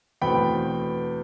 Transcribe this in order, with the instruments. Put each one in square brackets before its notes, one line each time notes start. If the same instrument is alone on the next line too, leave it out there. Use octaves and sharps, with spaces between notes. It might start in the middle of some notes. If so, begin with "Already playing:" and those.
[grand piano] E2 B2 A3 C4 G5 B5